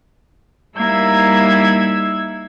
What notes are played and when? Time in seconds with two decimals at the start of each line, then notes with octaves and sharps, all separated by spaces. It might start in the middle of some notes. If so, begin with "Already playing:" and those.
0.76 G3 A#3 D#4 E4 E6 G#6